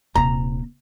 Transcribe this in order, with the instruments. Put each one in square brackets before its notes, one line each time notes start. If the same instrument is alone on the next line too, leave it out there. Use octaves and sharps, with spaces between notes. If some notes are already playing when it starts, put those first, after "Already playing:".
[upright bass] D#1 C3 [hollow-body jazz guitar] A#5